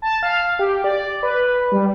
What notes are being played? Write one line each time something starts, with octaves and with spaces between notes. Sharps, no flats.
A5
F5
G4
D5
B4
G3